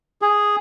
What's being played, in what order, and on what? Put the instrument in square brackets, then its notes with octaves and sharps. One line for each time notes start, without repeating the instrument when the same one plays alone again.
[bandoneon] G#4